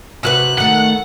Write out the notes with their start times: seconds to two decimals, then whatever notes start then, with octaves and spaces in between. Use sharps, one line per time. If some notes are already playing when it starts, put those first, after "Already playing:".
0.23 C3 F#4 B4 F#6
0.58 D#3 A3 F#5